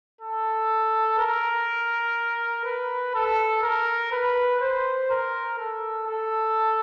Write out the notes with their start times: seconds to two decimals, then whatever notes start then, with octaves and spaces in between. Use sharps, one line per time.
0.21 A4
1.19 A#4
2.65 B4
3.15 A4
3.63 A#4
4.12 B4
4.61 C5
5.10 A#4
5.58 A4
6.07 A4